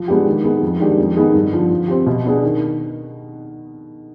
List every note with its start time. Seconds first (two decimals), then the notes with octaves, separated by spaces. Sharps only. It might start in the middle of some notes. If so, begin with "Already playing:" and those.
Already playing: F3
0.08 G#3 B3 D4 G4
0.26 D#3
0.44 B3 D#4 G#4
0.62 F2
0.80 D#3 G#3 D4 G4
0.98 F2
1.17 D#3 B3 D#4 G#4
1.34 G2
1.52 D3 F3
1.71 F3
1.88 C4 G4
2.06 B2
2.25 B3 D4 G#4
2.42 D#3